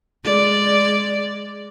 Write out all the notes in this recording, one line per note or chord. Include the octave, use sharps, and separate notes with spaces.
G#3 D5